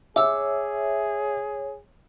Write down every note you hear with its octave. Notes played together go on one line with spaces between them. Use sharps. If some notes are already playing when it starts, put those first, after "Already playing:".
G#4 C#5 E5 D6 E6